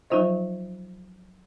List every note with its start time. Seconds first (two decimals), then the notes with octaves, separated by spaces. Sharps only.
0.10 F3 F#3 D#4 F4 C5 D#5